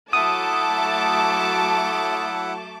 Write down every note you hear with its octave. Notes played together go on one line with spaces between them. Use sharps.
F#3 A3 E4 F#5 A5 D6 D#6